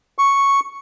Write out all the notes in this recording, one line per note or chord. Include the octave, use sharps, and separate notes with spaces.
C#6